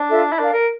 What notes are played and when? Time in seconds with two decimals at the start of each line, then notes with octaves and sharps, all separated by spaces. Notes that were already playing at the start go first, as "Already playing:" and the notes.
Already playing: D4
0.10 F4 A4 E5
0.32 E4
0.39 D4 A#4 D5 F5
0.53 A#4